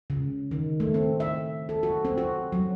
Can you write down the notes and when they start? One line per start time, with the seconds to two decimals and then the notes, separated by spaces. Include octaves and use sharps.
0.10 C#3
0.51 D#3
0.80 A3
0.94 C4
1.20 E5
1.69 A4
1.83 F#4
2.05 C4
2.18 F#4
2.52 F#3